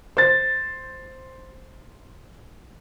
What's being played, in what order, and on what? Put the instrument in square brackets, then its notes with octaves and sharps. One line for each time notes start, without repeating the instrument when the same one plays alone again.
[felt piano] C5 A6